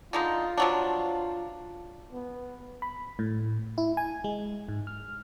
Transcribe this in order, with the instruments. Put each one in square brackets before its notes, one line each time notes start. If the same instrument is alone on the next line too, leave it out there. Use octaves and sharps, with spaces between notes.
[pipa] D3 G#3 D#4 [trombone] F4
[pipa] F3 F#3 D4
[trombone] B3
[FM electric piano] B5
A2
E4
G#5
G#3
G#2
F6